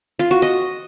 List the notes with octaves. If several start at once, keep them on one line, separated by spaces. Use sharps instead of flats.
F4
F#4
D#5